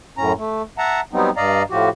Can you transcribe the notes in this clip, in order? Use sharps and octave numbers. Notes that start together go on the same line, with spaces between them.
F#2 A2 C#4 A#5
A3
E5 F#5 A5 A#5
F#3 G3 B3 C4 D#4
G2 D5 D#5 F5 A#5
A2 F3 F#4 G4